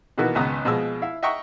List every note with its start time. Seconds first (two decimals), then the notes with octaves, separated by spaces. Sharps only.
0.18 B2 D#3 E3 A#3 B3 F#4
0.35 G#1 C#2 B3 B4 A#5 D#6
0.65 B2 F3 G#3 E6
1.02 E4 E5 F5
1.23 D#5 E5 F#5 G5 A#5 C#6